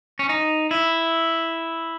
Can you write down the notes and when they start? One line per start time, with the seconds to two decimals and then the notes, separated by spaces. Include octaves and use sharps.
0.19 C#4
0.29 D#4
0.71 E4